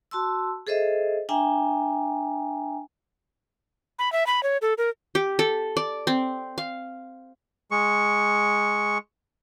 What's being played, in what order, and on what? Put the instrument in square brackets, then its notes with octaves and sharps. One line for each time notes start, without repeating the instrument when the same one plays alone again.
[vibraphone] F#4 A5 C6 E6
G#4 A4 C5 D#5 E5
D4 E5 G5 G#5 A#5
[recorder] B5
E5
B5
C#5
A4
A#4
[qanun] G4
A4
D5
C4
F5
[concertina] G#3 C#6